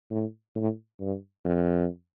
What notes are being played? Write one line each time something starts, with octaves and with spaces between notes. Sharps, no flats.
A2
A2
G2
F2